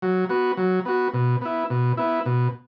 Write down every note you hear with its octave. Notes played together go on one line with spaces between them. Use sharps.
F#3
B3 F#4
F#3
B3 F#4
B2
B3 E4
B2
B3 E4
B2